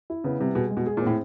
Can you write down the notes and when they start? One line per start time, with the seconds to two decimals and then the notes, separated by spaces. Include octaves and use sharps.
0.10 E4
0.24 C#3 B3
0.40 C3 G3
0.55 B2 G#4
0.71 G#3
0.77 B2
0.86 G#4
0.97 A#2
1.02 A2 C4